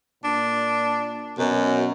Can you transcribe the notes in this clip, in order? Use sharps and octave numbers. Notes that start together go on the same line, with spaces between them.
A#2 D4
F#2 B2